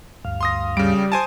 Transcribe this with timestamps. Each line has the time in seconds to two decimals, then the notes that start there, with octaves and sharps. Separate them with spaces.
0.25 D2 G2 F5
0.41 C6 D#6 A#6
0.77 C#3 G3 D7
1.12 C5 G#5 A5